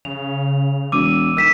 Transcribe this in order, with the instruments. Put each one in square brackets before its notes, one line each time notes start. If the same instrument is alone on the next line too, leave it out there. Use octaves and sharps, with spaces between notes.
[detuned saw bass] C#3 [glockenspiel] F7
[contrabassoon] E1 [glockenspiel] D6 E6 D#7
[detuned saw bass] D#3 [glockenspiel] E6 B6 E7